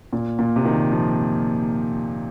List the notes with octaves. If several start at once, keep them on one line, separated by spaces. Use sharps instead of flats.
A#2
A#2
C3
D#3
F3